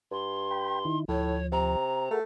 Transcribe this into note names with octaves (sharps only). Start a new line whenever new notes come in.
G2 C6
G5 B5
D#3 D#4 E4
D2 A2 F3 C#5
C3 A#5
A3 G#4 A#4 F#5